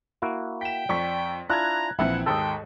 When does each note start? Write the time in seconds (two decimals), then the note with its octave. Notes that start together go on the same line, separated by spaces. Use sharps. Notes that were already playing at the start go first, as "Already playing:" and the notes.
0.22 A#3 E4 F#4
0.61 G5 B6 E7
0.89 F2 D5 C#6 B6
1.50 D4 E4 F4 A#5 F#6 G#6
1.99 A#1 E3 C4 E4 F#5
2.26 D#2 G#2 A4 D#5 G5